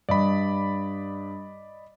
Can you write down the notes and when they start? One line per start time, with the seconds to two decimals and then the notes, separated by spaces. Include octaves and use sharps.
0.09 G2 D5 D#5 B5